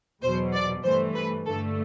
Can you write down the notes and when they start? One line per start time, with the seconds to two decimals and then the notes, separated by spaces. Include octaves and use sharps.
0.22 E2 B2 F#3 C5
0.53 D5
0.84 G2 E3 A3 C5
1.15 B4
1.46 G2 D3 A3 A4